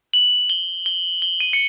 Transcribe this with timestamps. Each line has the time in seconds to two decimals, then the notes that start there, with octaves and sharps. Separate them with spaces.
0.14 F#7
0.50 G7
0.86 G7
1.22 G7
1.40 D#7
1.53 C#7